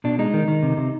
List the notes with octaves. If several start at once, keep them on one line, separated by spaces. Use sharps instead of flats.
B2 D4
G#3 D#4
D#3
D#3
C3
C3